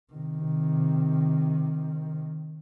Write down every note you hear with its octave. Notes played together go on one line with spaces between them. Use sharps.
C3 D#3